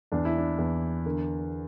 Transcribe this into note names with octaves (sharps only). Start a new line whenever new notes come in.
E2 D4
E4
D4
E2
D3 A#4